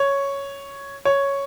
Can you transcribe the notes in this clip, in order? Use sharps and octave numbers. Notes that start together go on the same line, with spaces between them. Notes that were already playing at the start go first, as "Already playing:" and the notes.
Already playing: C#5
C#5